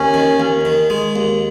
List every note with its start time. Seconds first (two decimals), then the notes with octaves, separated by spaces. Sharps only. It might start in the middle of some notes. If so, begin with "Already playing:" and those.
Already playing: D#2 C#4
0.14 D#3
0.40 D#2
0.65 D#3
0.90 G#3
1.16 D#2